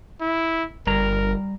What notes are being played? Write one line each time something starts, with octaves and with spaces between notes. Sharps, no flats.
E4
G1 G3 A#4 A#5